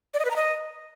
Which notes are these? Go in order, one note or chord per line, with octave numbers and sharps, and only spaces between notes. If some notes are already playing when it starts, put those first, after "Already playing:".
D5
D#5
B4
A#5
D#5